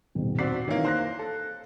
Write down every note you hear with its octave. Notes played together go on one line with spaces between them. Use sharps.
D#1 G#1 B2
C4 F#4 D5 C7
D#3 E3 A#3 D#4 C#5
C5 F5 F#6 A#6
A4